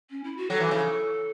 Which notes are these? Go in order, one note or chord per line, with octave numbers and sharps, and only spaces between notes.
C#4
E4
F#4
F#3 A4
E3
C#3